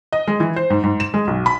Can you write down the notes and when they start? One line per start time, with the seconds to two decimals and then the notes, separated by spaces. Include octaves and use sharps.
0.13 D#5
0.27 G#3
0.40 E3
0.56 C5
0.70 G#2
0.84 G#2
1.00 E7
1.14 G#3
1.27 B1
1.46 B5